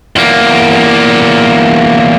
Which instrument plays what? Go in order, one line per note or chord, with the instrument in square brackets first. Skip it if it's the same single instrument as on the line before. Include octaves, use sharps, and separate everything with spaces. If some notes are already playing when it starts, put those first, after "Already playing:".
[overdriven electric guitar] E2 A#3